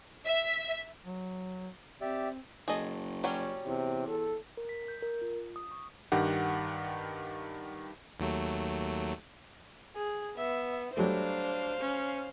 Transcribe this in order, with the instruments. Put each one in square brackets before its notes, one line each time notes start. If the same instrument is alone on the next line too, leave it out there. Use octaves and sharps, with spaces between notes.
[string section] E5
[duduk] F#3
[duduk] C4 [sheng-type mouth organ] G4 D5 E5
[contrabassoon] F#1 [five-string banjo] G#4 A4 D#5
[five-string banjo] F#3 G3 C#4
[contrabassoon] E2 [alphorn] C3
[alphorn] A4
[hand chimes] A#4
B6
G6
A#4
F4
D#6
C#6
[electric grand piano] G2 D#3 G4 F#5
[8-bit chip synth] D#2 F#3 A3
[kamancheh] G#4
[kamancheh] B3 [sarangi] E5
[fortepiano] F#3 G3 A3 [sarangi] D4 [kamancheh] C5 F5
[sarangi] C#4